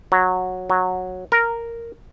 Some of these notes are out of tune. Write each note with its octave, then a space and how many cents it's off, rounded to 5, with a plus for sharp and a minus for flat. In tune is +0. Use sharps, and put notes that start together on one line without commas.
F#3 -10
F#3 -10
A#4 -5